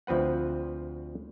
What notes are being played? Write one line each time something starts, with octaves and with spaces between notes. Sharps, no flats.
D2 F3 C4 B4 F#5